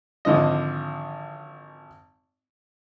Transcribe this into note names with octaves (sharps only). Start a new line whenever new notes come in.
G#1 D3 F3 D#5